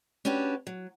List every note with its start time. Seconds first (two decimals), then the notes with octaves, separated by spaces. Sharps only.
0.25 C#4 D4 F#4 G4 B4
0.67 F#3